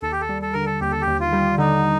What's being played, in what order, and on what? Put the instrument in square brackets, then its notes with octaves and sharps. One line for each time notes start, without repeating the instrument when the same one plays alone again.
[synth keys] D#2 [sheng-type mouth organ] A4
[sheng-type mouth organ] G4
A4
[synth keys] G3
[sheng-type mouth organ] A4
[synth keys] D3 [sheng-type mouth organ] A#4
[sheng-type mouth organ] A4
[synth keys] D#2 [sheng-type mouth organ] G4
[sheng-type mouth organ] A4
G4
[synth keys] D#2
[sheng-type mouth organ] F4
[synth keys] G3
[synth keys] D3 [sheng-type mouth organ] D#4